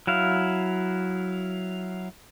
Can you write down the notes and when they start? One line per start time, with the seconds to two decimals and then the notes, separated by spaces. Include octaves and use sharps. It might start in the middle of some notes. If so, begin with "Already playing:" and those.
0.07 F#3 E4 F5